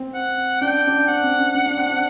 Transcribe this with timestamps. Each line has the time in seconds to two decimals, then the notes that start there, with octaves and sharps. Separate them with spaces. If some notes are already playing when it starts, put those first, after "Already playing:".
Already playing: C4
0.14 F#5
0.61 D4 G5
0.87 D4
1.08 C4 F#5
1.23 C4
1.39 D4
1.55 D4
1.66 D4
1.77 C4
1.89 D4